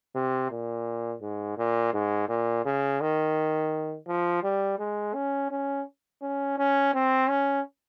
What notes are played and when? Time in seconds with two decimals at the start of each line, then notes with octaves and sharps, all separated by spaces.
0.15 C3
0.51 A#2
1.21 G#2
1.57 A#2
1.93 G#2
2.29 A#2
2.65 C#3
3.01 D#3
4.08 F3
4.43 G3
4.79 G#3
5.14 C#4
5.51 C#4
6.22 C#4
6.58 C#4
6.94 C4
7.29 C#4